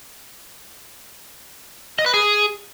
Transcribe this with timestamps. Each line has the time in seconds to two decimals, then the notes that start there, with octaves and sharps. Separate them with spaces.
1.99 D#5
2.06 B4
2.14 G#4